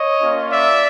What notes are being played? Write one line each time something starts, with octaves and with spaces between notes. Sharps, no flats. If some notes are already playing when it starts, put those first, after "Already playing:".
Already playing: C#5 D#5
A#3 C#4 F4
D5 E5